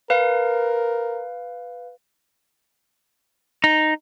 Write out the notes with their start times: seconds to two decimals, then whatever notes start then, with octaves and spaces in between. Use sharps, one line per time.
0.10 A#4 B4 F5
3.64 D#4